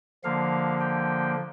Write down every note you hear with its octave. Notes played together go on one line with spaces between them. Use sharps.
D3 F3 A#3 F5
G5